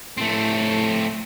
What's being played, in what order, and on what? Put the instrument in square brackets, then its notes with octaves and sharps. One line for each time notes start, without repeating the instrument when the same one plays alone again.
[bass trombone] A2 [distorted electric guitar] A3 C4